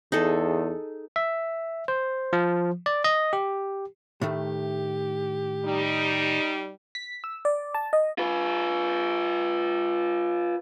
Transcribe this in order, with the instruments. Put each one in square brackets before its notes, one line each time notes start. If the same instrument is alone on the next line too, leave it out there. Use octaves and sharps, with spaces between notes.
[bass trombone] E2 [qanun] D#4 G#4 A4
[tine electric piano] E5
C5
F3
D5
D#5
G4
[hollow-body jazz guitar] A2 D#3 A3 [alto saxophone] G4
[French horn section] G3 D#4
[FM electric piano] B6
E6
D5
A5
D#5
[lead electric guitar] F4 B4